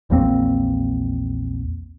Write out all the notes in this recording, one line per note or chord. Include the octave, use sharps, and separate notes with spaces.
A#1 E2 A#3 C4